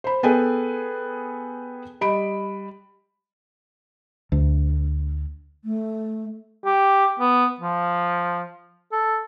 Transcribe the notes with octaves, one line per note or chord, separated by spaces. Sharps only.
C5 B5
B3 G#4 A4 B4 G5 G#5
G3 D#5 B5 D7
D2
A3
G4
B3
F3
A4